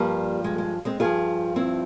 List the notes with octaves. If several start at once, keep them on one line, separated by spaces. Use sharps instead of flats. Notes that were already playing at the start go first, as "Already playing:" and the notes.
Already playing: G2 F3 G3 A#3
G#3
G#3
G#3 C4
G2 F3 F4 G#4
C4 E4